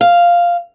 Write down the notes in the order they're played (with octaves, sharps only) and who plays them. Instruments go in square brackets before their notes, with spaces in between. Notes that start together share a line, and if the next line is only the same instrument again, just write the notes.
[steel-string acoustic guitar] F5